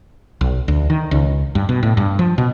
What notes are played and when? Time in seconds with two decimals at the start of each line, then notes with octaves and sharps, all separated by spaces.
0.41 B1
0.68 D2
0.90 D#3
1.11 C#2
1.55 G2
1.69 B2
1.83 A2
1.97 G2
2.19 F3
2.38 B2